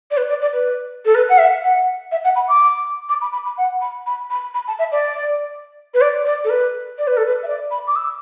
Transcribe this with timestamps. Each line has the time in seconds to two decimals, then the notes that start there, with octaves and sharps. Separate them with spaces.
0.11 D5
0.17 B4
0.29 D5
0.41 D5
0.53 B4
1.05 A4
1.14 B4
1.29 F#5
1.38 E5
1.63 F#5
2.11 E5
2.24 F#5
2.35 B5
2.48 D6
3.09 D6
3.21 B5
3.32 B5
3.45 B5
3.57 F#5
3.81 B5
4.06 B5
4.30 B5
4.54 B5
4.67 A5
4.79 E5
4.92 D5
5.94 B4
6.01 D5
6.25 D5
6.44 A4
6.49 B4
6.98 D5
7.07 B4
7.17 A4
7.25 B4
7.43 E5
7.47 D5
7.71 B5
7.87 D6
7.95 E6